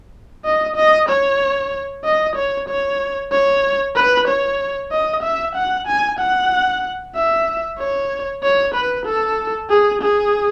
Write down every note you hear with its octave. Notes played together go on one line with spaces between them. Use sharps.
D#5
D#5
C#5
D#5
C#5
C#5
C#5
B4
C#5
D#5
E5
F#5
G#5
F#5
E5
C#5
C#5
B4
A4
G#4
G#4